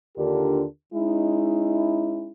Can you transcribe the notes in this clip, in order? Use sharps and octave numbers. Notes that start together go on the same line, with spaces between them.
D#2 D3 D4 F4 G4 A#4
G#3 C#4 D#4 E4